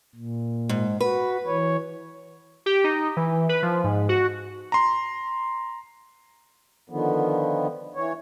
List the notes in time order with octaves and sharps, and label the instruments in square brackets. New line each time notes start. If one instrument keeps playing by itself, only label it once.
[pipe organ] A#2
[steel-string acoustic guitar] G#2
[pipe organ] F#4 [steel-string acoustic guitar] B4
[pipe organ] E3 C#5
[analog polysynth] G4
D#4
E3
B4
F3
G#2
F#4
[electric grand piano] A#5 C6
[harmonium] D3 D#3 F3 B3
E3 C#5